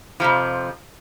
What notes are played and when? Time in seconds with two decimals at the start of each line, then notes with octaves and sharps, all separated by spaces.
0.20 F2 C3 F3